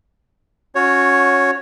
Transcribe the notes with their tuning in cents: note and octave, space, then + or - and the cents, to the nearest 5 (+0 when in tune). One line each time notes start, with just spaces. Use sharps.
C#4 +0 F#4 -25 C#5 +0